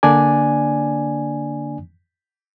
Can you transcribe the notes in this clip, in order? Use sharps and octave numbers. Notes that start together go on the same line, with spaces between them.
D3 A#3 D4 D5 G#5